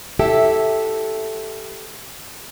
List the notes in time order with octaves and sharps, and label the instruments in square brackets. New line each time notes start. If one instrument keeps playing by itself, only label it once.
[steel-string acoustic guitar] E4 G4 A4 E5